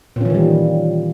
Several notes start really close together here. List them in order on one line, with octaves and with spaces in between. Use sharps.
A#2 C#4 E3 D#3 G3